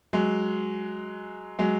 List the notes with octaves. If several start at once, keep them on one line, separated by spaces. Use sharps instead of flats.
F#3 G#3
F#3 G#3